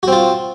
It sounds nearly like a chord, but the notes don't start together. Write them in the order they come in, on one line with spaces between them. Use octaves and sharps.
F#4 C4 F4